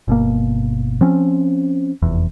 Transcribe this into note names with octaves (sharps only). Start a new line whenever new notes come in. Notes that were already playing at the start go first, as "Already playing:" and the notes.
G1 B2 A#3
F3 C4 C#4
F1 E2